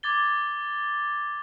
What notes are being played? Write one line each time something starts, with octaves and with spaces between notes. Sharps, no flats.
D6 G#6 A6 G7